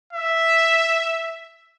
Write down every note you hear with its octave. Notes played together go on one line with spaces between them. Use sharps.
E5